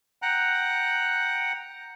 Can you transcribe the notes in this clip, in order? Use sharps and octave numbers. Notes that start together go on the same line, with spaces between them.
F#5 G5 A#5 F#6